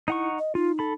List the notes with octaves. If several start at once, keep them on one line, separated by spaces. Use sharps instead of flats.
D#4 E4 F#5 C#6
D#5
D#4 F4
A4 B5